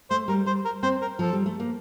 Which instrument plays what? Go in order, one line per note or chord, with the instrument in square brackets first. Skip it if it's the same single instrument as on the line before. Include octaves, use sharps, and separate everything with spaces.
[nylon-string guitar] A3 [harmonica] C5
[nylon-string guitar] G3 [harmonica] A#4
[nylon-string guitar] G3 [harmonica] C5
[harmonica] A#4
[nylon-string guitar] C4 [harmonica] C5
[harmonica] A#4
[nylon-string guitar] F3 [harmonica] A4
[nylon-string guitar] G3
A3
A#3